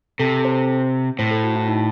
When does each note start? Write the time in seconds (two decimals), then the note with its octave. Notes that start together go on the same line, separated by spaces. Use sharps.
0.19 C3 A4
0.39 A4
0.45 C5
1.19 A2 C5
1.31 A4
1.43 F#4
1.56 E4
1.68 D#4